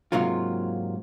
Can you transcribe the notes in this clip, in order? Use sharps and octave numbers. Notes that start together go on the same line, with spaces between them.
G#2 C3 F#3 A#3 F4